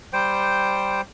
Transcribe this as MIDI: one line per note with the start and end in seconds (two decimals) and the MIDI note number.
0.13 1.01 55
0.13 1.01 72
0.13 1.01 79